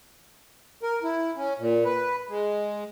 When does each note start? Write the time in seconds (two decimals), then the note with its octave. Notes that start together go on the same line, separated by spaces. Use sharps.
0.83 A#4
1.03 E4
1.36 C#4
1.59 A#2
1.85 B4
2.29 G#3